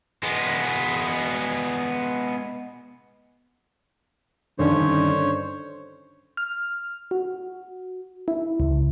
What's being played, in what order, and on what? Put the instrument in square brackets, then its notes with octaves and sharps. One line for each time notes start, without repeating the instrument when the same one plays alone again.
[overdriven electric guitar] G#3 B3
[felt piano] G2 D#3 C#4 [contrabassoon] D3 [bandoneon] C5 C#5
[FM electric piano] F6
F#4
E4
C#2